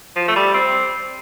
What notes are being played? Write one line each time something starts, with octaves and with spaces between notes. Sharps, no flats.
F3
A3
G3
C4